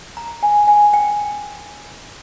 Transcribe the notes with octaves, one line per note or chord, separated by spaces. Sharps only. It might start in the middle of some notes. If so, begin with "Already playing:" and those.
A#5
G#5
G#5
G5